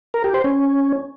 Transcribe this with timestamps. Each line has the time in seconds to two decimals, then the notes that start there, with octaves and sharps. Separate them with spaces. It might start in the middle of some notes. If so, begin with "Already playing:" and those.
0.14 A#4
0.24 G4
0.34 C5
0.44 C#4